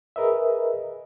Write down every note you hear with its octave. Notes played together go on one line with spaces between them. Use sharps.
G#4 A#4 B4 D#5 E5